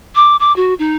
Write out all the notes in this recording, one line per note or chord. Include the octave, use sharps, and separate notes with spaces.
D6
D6
F#4
D#4